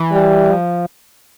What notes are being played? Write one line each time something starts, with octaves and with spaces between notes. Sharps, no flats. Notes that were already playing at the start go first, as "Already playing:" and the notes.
Already playing: E3
G3
F3